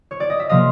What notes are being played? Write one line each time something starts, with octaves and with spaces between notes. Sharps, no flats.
C#5
D5
D#5
E5
C3 F3 A#3 D#5 F5